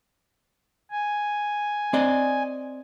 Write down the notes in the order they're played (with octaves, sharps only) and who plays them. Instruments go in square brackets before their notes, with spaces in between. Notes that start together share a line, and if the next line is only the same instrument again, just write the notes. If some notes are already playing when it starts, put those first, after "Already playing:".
[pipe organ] G#5
[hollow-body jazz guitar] C4 D5 D#5